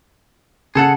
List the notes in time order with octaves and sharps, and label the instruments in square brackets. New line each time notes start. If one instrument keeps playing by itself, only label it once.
[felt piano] C#3 [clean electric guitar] G#4 A4 F#5